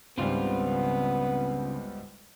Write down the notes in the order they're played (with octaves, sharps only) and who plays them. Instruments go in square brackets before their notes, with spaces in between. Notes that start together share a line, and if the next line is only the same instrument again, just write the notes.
[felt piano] G#1 C#2 G3 [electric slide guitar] C#3 C4 F4 [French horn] B3